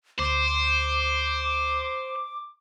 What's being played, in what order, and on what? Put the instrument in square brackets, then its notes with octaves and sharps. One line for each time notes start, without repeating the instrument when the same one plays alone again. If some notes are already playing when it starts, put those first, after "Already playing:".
[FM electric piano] D2 [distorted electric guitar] C5 [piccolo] D6